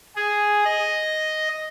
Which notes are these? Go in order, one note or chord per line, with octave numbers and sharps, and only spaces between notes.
G#4
D#5